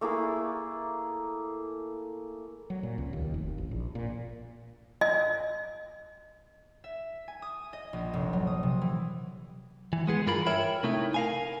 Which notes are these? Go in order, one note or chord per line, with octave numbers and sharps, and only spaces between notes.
A3 A#3 E4 G#4
F#3
A#2
C#2
D#2
F1
A1
A#1
A#2
D#5
E5
G#5
D#6
D#5
A#1
F1
F#3
D#6
C3
E3
E3
G#3 B3 G#4
G2 E3 F4 A#4 B5
A#4 C#5 E5 G5 B5
C3 A3 D#4 E4
A#4 F5 G#5